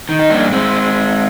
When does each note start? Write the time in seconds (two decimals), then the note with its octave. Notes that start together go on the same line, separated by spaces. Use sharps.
0.09 D#3
0.19 D#4
0.30 G2 A#3 D4
0.52 G#3 C4